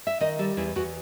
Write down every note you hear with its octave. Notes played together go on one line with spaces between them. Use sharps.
E5
D#3 D#5
G3 A4
E2 E4
E2 F#4